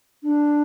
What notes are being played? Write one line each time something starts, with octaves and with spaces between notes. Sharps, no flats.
D4